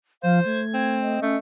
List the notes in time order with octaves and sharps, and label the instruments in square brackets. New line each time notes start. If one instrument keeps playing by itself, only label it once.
[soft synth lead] F3 [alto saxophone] C5 [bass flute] F5
[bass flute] A3 [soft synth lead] G#6
[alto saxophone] C4
[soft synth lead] D#5
[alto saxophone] A3 [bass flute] C#4